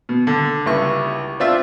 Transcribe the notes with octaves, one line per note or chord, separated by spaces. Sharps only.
B2
D3
C#2 G3 E4 C#6
C4 D4 F4 E5